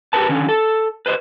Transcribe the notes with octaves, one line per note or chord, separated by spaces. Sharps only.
G4 G#4 A#4 B4 A5
D3 D#3 C#4
A4
B4 C5 D#5